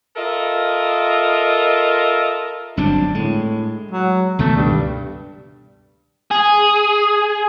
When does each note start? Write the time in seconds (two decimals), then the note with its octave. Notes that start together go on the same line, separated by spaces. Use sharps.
0.16 F4 A4 A#4 D#5 E5
2.77 G1 F#3 C4 D4
3.15 A2 G#3
3.91 F#3
4.39 C#2 B2 D#3 A3
4.56 G2
6.31 G#4